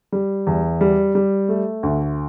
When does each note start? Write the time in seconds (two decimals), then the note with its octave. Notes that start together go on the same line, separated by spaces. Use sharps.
0.12 G3
0.47 E2
0.81 G3
1.15 G3
1.49 A3
1.83 D2